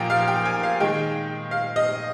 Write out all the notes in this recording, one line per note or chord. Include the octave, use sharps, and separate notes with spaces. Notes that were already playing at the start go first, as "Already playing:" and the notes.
Already playing: A#2 F3 A#3 G5 G#5
F5
G5
G#5
F5
D#3 G#3 G5
F5
D#5